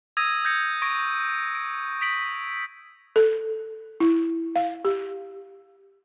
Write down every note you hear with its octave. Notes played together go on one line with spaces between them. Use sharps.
D#6 E6 G#6 A#6 D#7
G6 G#6 A#6 C#7
C#6 G#6 A#6 D7
D7
D#6 B6 D7 F#7
A4
E4
F5
G4